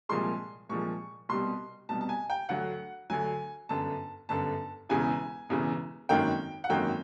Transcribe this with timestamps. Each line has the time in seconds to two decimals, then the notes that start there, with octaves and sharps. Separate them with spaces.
0.09 C2 A#2 F3 G#3 C6
0.69 C2 A#2 F3 G#3 C#6
1.29 C2 B2 G3 C6
1.89 C2 B2 G3 A5
2.01 A5
2.09 G#5
2.30 G5
2.49 D2 D3 F#3 F#5
3.10 D2 D3 F#3 G#5
3.69 G1 F#2 D3 A5
4.29 G1 F#2 D3 A5
4.89 E1 E2 C#3 E3 G#5
5.49 E1 E2 C#3 E3
6.09 G#1 F#2 D#3 F#3 A#3 G5
6.64 F#5
6.70 G#1 F#2 D#3 F#3 A#3 G5